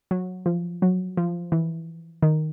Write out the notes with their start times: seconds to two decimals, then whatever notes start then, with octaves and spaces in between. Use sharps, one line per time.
0.11 F#3
0.46 F3
0.82 F#3
1.17 F3
1.52 E3
2.22 D#3